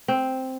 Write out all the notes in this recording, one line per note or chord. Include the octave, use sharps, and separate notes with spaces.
C4